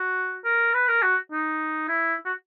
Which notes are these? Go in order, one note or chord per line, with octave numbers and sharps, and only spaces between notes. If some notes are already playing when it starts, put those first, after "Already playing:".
Already playing: F#4
A#4
B4
A#4
F#4
D#4
E4
F#4